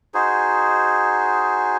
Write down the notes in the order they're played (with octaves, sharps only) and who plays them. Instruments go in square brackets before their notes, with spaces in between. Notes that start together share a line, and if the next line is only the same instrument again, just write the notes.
[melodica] D#4 F#4 G#4 C5